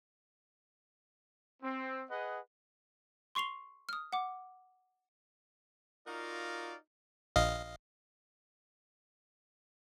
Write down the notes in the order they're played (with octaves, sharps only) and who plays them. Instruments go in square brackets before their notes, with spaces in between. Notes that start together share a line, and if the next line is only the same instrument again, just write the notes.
[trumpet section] C4
G#4 B4 D#5 F#5
[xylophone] C6 C#6 C7 F7 G7
D#6 F6
F#5 D6
[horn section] D#4 F4 F#4 A#4 D5 F5
[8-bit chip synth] A#1 D#5 F5